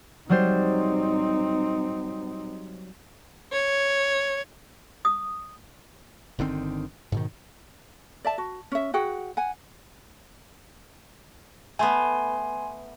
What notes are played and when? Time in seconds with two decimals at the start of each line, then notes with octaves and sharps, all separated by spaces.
0.29 F#3 G3 C4 D#4 C5
3.53 C#5
5.05 D#6
6.39 G1 D3 D#3 C4
7.12 G#2 B2 D#3
8.24 D5 E5 A5
8.38 F#4
8.72 C#4 E5
8.94 F#4 G#4 F#5 G5
9.37 F#5 G#5
11.79 A3 B3 G#5 C6